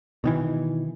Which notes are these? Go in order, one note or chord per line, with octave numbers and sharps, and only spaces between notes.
B2 D#3 E3